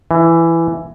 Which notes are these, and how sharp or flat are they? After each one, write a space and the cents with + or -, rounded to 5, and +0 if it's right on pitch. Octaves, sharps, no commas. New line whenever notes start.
E3 +10